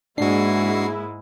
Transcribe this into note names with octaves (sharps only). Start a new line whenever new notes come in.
G#2 G#3 A#3 D4 E4 F#4 C7